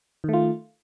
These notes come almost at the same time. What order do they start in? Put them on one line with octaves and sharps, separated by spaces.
D#3 A3 F4